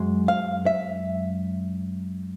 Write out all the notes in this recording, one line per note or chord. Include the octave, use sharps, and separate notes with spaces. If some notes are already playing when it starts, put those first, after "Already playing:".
Already playing: F#2 G#3
F5
E5